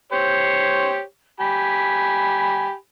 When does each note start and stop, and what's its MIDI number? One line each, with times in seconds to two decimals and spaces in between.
0.12 1.01 67
0.12 1.01 72
0.12 1.01 73
1.40 2.74 67
1.40 2.74 80
1.40 2.74 83